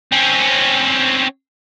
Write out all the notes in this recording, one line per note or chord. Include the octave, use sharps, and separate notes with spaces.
C4 C#4